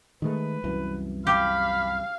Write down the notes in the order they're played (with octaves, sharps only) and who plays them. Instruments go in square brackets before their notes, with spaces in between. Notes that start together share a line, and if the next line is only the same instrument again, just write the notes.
[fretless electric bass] D#3 G#3 A3 [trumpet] B4
[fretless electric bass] C2 F#2 E3
[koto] G4 [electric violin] F5 [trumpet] B5